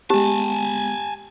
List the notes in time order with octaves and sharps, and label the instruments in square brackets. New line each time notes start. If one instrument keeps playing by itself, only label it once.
[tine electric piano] G#3 B3 [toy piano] G4 [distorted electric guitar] G#5 A5